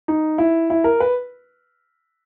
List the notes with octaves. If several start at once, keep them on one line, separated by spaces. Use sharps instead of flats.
D#4
E4
E4
A#4
B4